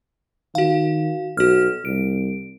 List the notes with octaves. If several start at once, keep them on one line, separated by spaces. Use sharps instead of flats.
D#3 F#4 F5
B1 F#4 F6
C2 D7